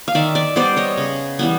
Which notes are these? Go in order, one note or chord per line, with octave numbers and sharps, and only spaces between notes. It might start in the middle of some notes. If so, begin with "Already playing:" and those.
F5
D#3 D5 E5
D5 E5
G3 B3 C5 D5
C#5 D#5
C#3
E3 G3 B3